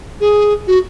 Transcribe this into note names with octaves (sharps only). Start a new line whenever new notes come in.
G#4
F#4